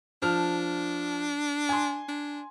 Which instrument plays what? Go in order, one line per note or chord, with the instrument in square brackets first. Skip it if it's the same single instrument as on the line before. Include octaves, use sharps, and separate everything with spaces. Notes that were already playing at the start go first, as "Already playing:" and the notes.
[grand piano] F3 A5 F6 [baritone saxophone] D4
[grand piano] G#5 C6
[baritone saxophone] D4